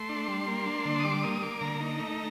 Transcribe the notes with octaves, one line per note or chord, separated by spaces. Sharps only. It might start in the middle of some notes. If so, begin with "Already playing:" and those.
Already playing: A3 C6
D4
G3
A#3
D4
D3
D#6
G3 D6
A#3 D#6
A#3 D6
D3 A#5
D#4
A3